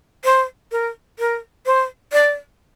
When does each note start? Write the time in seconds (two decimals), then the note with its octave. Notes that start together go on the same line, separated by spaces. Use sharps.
0.25 C5
0.72 A#4
1.19 A#4
1.66 C5
2.13 D5